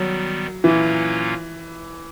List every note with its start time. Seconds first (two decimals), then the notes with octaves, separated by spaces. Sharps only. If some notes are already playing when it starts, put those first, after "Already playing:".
Already playing: D#3 F#3 G3 B3
0.64 A#2 E3 F#3 A#3 C#4 F4